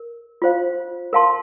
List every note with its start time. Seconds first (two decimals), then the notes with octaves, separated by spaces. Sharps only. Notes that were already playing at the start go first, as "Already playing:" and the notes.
Already playing: A#4
0.42 F4 C5 F5
1.13 A#4 F5 A5 C6